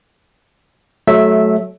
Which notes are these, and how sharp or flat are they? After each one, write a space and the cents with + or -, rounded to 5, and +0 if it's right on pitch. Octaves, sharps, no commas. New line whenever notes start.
F#3 +0 A3 -20 E5 -5